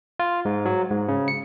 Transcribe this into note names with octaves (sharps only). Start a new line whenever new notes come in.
F4
G#2
F#3
G#2
C#3
C#7